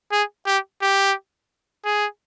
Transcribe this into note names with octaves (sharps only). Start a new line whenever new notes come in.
G#4
G4
G4
G#4